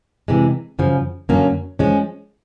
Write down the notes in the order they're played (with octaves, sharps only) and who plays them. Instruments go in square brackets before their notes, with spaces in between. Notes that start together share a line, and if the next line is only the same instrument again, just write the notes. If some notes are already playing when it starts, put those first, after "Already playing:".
[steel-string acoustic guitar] C3 E3 G#3
F#2 C#3 F3
F#2 D3 F#3 A#3 C#4
F3 G#3 C#4